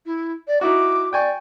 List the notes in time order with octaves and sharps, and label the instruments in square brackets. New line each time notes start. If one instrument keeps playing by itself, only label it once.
[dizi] E4
D5
[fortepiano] D#4 E4 F#4 [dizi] D6
[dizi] D5 [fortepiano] G5 G#5 C#6